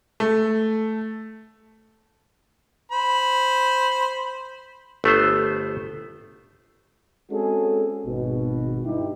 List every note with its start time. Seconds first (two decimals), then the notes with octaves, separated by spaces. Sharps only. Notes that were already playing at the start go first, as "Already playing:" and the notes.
0.20 A3
2.92 C5 B5
5.04 G1 A3 B3 C5
7.31 G#3 C4 C#4 F#4 G#4 A4
8.06 G#1 B2
8.84 G2 D#4 E4 G4